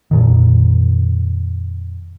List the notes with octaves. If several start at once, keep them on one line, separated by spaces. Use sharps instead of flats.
F2 A#2 D#3